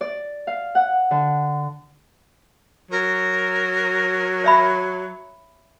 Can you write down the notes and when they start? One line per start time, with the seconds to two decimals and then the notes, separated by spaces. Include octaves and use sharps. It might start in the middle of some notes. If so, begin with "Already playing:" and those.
0.01 D5
0.47 F5
0.75 F#5
1.11 D3
2.91 F#3 A#4
4.44 C#5 E5 B5